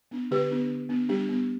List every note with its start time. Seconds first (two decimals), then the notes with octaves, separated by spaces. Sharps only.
0.11 B3 D4
0.31 D3 G4 B4
0.51 B3 D4
0.71 D3
0.89 B3 D4
1.09 G3 D4 G4
1.29 B3 D4